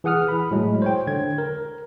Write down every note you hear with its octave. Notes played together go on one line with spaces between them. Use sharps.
E3 G#4 F#5 D#6 F6
B5
A2 F#3 G#3
C5 C#5 G5
D3 G#6
A#4